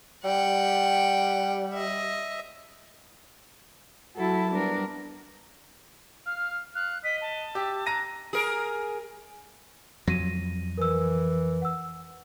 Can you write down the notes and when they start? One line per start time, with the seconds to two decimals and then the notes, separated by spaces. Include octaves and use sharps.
0.25 G3 F#5 G5
1.73 D#5 E5
4.16 F#3 E4 F#4 A4 A5
4.51 G3 B3 D4 A#4
6.26 F5 F6
6.75 F5 F#6
7.04 D#5 B6
7.21 A5
7.55 G4 E5
7.86 D4 A#5 A#6 D#7
8.33 G#4 A#4
10.08 F2 F#3 A#6 D#7
10.78 E3 A#4 E6
11.62 F#5 E6